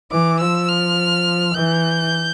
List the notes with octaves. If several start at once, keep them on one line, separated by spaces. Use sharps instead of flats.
E3 D6
F3 E6
F6
E3 G6